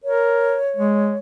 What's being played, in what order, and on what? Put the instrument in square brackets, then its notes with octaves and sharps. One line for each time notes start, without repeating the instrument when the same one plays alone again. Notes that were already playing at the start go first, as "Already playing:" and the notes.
[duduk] A#4 [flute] C#5
[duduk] G#3